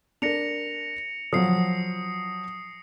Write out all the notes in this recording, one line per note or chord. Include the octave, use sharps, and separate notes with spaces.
D4 A#4 A#6 C#7 F7
F3 F#3 D#6 C7